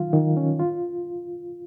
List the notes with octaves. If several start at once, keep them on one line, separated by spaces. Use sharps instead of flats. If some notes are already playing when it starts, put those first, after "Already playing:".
Already playing: D#3 F#3 F4 F5
D#3
C#4
F4